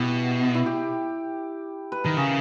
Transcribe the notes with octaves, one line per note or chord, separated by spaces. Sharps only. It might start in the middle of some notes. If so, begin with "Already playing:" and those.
Already playing: B2 E4 G4
E4
G4
B4
D#3 A#4
C#3 G#4